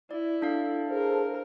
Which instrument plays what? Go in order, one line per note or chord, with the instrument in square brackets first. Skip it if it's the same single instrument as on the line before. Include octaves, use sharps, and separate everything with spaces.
[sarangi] E4 [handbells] D5
[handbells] D4 F5 [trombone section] A4
[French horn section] G#4 C5 [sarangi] A#4